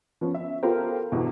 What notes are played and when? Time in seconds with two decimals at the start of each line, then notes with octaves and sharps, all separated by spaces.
0.21 F3 B3 C#4
0.34 E5
0.63 B3 F4 G4 A4 A#4 C5
1.12 E2 G2 B2 D3 E3